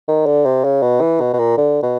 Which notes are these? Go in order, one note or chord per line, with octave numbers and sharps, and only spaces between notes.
D#3
D3
C3
C#3
B2
E3
B2
B2
A#2
D3
B2